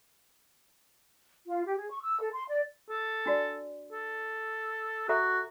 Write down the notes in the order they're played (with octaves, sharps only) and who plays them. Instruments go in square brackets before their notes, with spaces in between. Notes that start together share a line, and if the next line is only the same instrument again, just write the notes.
[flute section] F4
G4
G#4
C#6
E6
A4
C6
D5
[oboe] A4
[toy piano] D4 F#4 D5
[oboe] A4
[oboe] F#4 [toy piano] A4 E5 A#5